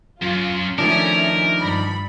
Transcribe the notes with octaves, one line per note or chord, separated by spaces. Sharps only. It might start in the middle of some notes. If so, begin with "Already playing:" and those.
F#2 F4
D#3 F3 A3 C#4 D4 A#4 E5 G#5
G2 B5